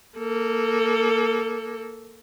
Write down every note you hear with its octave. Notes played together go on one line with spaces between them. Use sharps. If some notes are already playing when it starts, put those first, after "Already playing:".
A#3 A4